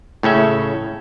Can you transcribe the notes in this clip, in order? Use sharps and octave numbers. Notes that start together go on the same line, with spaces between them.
A2 C#3 C#4 E5